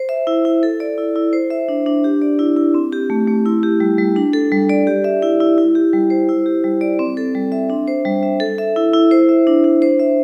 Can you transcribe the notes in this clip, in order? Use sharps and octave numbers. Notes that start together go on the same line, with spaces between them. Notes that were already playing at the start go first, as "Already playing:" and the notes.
Already playing: C5
E5
E4
E4
A4
D5
E4
E4
C5
E5
D4
D4
G4
D5
E4
E4
C4
G4
A3
A3
E4
G4
G3
G3
D4
A4
G3
D5
G4
E5
E4
E4
E4
G4
G3
C5
E4
G4
G3
D5
C4
A4
G3
E5
D4
C5
G3
E5
A4
E5
E4
E4
C5
E5
D4
D4
C5
E5